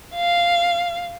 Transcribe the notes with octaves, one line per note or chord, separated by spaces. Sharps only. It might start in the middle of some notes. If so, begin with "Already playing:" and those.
F5